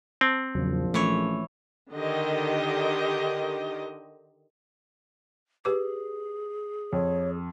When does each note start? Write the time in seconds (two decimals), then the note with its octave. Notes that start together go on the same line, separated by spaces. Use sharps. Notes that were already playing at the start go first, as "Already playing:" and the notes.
0.21 C4 A5
0.55 A#1 E2 C#3 F3 F#3
0.94 E3 A3 C#4 C#5
1.93 D3 D#3 G4 D#5
5.65 G4 G#4 B4 D6
6.93 F2 C#5